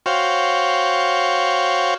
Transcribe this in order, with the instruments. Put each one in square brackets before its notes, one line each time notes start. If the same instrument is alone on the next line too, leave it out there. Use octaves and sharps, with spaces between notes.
[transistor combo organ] F#4 C5 C#5 F5 G5